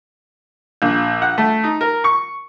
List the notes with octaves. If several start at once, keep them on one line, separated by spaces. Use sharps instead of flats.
A#1
F#5
A3
D#4
A#4
C#6